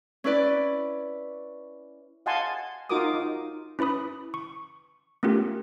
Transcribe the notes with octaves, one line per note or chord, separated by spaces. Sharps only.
C#4 E4 B4 D5
D#5 F5 F#5 G#5 A5 C6
D#4 F4 F#4 A#4 D6 D#6
D#4
C#4 E4 B4 B5 D#6
C#6
A3 B3 C#4 F4 G4 A#4